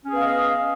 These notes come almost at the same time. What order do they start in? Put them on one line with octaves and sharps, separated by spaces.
C#4 G#4 B3 F5 D#5